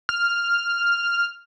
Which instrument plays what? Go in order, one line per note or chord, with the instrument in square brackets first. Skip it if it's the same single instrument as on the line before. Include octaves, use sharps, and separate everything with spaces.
[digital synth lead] F6